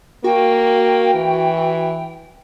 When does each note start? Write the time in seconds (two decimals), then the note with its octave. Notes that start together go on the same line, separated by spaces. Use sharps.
0.24 A#3 F#4 G5
1.14 E3